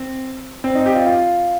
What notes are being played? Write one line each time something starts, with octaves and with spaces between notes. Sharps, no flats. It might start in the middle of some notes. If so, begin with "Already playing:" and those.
Already playing: C4
C4
D#4
G4
F4
F4